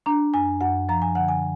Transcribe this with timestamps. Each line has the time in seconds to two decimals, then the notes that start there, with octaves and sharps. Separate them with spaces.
0.06 D4 A#5
0.34 F#2 G#5
0.61 F#2 F#5
0.89 F3 A#5
1.02 G#5
1.15 D3 F#5
1.29 G#5